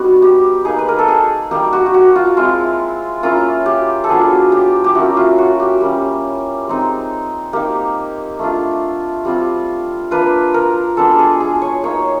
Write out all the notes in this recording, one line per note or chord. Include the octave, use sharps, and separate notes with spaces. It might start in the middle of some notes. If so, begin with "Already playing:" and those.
Already playing: G3 B3 D#4 F#4
G4
A#3 D#4 G#4
B4
A#4
A4
G#4
G3 A#3 D#4 G4
F#4
G4
F#4
F4
G#3 C4 E4 F4
A#3 C#4 E4 F4
G4
A4
F#3 B3 D4 F4 G#4
G4
G4
A#3 C#4 E4 F#4
F4
F#4
G4
G3 A#3 C#4
G#3 C4 D#4
A#3 D#4 G4
A3 D4 F4
G3 C4 F4
A#3 D4 F4 B4
A#4
G#3 B3 D4 A4
G#4
G#4
C#5
A#3 D#4 C#5